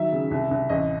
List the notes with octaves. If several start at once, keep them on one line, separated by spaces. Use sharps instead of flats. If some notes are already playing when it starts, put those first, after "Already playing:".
Already playing: D#3 F#3 E5
C#3
C2
C2
A1 D#5